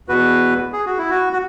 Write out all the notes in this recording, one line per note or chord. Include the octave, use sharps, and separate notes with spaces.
E2 B2 B3 F#4 B4
G#4
F#4
E4
F#4
F#4